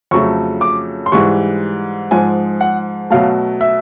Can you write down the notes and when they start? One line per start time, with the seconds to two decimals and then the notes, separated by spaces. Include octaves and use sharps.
0.11 F2 C#3 F#3 A3 C#6
0.61 D6
1.06 C6
1.12 G#2 E3 G3 C#6
2.11 G#2 F3 G#3 G#5
2.61 F#5
3.10 B2 F#3 A3 F5
3.61 E5